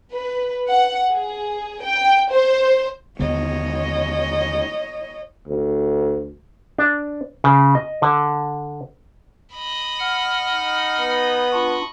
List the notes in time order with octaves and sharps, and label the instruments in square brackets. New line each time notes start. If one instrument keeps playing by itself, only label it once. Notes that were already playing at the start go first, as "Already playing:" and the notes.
[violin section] B4
F#5
G#4
G5
C5
[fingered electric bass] D#2 D3 B3 [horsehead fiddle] C#5 D#5
[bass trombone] D2
[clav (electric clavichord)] D4
C#3
D#5
D3
[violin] D#5 B5
[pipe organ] F#5 F6
[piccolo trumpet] D#4
[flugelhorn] B3
[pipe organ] D4 F4 [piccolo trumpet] C#6